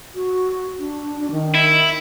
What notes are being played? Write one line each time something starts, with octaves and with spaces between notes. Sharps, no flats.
F#4
D4
D4
D#3
E4